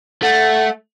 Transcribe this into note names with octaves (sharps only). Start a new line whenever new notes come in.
A3 F#5